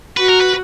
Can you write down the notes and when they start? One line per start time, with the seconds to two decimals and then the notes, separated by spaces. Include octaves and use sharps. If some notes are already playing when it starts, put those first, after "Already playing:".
0.17 F#4 B4
0.29 A#4
0.41 B4